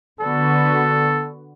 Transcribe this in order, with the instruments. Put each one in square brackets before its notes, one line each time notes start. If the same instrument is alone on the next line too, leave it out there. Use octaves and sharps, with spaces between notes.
[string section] D3 B3 F#4 [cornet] A4